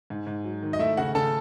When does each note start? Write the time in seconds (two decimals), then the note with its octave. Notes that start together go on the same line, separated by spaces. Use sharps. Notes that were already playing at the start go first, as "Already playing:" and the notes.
0.10 G#2
0.27 G#2
0.44 F#3
0.63 D#3
0.73 D#5
0.79 A3 E4 E5
0.97 C#3 F#4 F#5
1.15 C#3 A4 A5